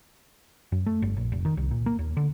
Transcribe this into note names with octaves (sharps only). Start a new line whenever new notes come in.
F#2
A3
G1
A#1
F1
D#3
C2
A#2
A#3
D#2
D3